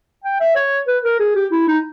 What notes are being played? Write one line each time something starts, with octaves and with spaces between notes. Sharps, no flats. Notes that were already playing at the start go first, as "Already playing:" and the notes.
G5
E5
C#5
B4
A#4
G#4
G4
E4
D#4